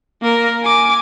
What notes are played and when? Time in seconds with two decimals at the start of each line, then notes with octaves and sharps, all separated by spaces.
0.22 A#3 A#4
0.62 G#5 D6